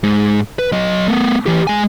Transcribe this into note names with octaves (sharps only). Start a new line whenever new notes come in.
G#2
B4
F#3 D#5
A3 B3
E3 G4
G#3 G#5